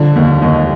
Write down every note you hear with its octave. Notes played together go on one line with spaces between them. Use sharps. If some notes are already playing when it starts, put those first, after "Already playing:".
Already playing: D3 F3
D#2
D#2 D#5